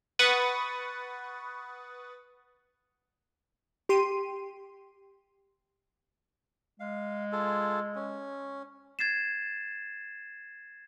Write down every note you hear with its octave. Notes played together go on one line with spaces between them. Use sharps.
B4 F#5 C#6 D#6 A6
G4 C6 D#7
G#3 F5
F4 G#4 A4
C#4
G#6 A6 C7 E7